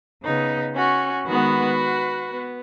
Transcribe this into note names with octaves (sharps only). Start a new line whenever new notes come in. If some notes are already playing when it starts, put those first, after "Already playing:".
C#3 B3 D#4
C#4 F#4
D#3 G#3 B3 F#4 B4
B3